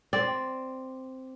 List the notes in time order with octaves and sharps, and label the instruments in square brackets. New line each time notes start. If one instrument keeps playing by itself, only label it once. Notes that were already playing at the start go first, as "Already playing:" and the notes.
[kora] C4 D5